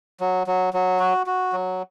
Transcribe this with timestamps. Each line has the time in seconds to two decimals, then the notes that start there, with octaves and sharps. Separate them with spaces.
0.20 F#3
0.47 F#3
0.74 F#3
1.00 F#4
1.27 F#4
1.53 F#3